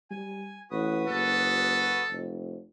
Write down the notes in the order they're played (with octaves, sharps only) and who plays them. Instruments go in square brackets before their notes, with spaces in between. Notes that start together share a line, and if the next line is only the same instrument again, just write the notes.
[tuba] G3 [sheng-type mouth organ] G#5
[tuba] A1 [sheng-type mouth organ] F#4 B4 D#6
[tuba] F#1 [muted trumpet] A4
[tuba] F1